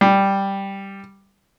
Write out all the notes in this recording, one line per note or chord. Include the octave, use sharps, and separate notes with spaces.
G3